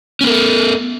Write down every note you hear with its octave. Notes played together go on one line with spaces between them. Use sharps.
B3 C#4 A4 A#4